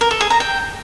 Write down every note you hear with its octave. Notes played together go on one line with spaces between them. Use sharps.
A#4
A4
G#4
A#5
G5